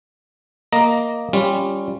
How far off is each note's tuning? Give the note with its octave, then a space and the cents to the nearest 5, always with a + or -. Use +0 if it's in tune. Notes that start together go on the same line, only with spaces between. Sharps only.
A#3 +0 D#5 +0 A#5 +0
G3 +5 C#4 +0 F4 -15